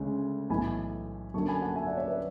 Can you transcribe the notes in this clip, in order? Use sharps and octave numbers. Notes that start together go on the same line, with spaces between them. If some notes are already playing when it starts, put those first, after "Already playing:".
Already playing: D2 C#3 G#3 C#4
B1 A2 E3 G#5 B5
F#2 D3 F#3 A5 C#6
G#5 B5
F#5 A5
E5 G#5
D5 F#5
C#5 E5
B4 D5